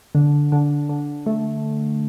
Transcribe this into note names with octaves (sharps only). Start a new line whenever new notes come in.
D3
D3
D3
A3